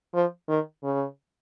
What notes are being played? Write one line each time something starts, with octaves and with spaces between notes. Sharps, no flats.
F3
D#3
C#3